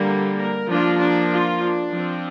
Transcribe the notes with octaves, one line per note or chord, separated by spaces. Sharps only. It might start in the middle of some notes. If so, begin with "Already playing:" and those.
Already playing: D3 G3 A#3
A#4
F3 A#3 D4 F4
D4
F4
D4
F3 C4